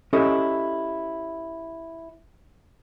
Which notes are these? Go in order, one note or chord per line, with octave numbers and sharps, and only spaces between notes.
C#4 E4 G4 A4 D#5